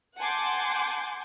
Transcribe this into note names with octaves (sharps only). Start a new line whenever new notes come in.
F#5 G#5 A5 C6 D6 G6